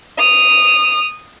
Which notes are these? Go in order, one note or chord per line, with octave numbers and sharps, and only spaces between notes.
D#6 F7